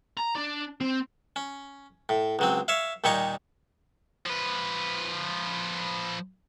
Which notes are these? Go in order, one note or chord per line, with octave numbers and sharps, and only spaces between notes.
A#5
D4
C4
C#4
A2
C#2 F#3 C4
C#5 E5 F5
D#2 A#2 G3 D#4 C#5 C#6
F3 B4